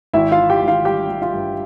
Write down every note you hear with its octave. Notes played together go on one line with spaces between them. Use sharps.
G#1 E4 E5
F4 F5
E3
G4 G5
G#1
F4 F5
G3 G4 G5
G3
F4 F5
G2